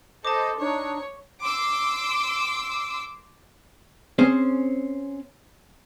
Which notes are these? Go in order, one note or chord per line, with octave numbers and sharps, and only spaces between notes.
A4 C5 D#5 A5 D6
D4 D#4 C#5
C6 D6 E6
C4 C#4 G#4 C5